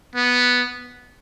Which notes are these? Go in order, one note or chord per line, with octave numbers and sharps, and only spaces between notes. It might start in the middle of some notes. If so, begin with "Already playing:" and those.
B3